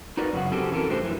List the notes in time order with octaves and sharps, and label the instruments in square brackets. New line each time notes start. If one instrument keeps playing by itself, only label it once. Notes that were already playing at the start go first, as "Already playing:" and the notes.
[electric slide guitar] D#4 F#4 A#4 B4 D5
F#2 C#3 F#4
C4 C#4 F#4 G4 A4
E3 A4 A#4
A2 D4 F#4 G4 C5
F#2 E3